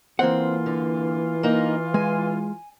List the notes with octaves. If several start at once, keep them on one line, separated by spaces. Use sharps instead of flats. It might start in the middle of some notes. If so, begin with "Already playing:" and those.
E3 A#3 C4 F4 F#5
D3
A#3 D#4
G#3 G#5